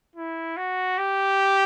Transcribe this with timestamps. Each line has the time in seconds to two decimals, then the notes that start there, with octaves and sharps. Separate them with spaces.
0.15 E4
0.57 F#4
0.98 G4